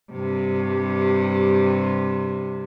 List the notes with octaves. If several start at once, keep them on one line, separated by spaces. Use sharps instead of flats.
G2 C3